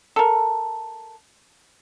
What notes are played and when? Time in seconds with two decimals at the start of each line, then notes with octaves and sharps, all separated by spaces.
0.16 A4 A#4